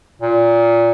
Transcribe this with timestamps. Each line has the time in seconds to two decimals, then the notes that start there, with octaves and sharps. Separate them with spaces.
0.22 A#2